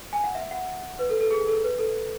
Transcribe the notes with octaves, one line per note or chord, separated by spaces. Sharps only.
G#5
F#5
E5
F#5
B4
A4
A4
G#4
A4
B4
A4